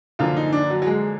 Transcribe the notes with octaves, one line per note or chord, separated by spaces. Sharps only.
F#2 D3 F3 A#3 F4
D#4
D4
F#3
F#3
G#3